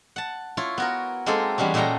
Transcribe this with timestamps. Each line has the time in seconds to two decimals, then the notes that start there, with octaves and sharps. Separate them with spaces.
0.16 F#5 A5
0.57 E4 F4 C#5
0.78 B3 F#4 A#4
1.26 G#3 A#3 C4 D#4 G#4 A4
1.58 E3 G3 G#3 B3 C#4
1.74 A#2 G#3 A4 F#5 G5 A#5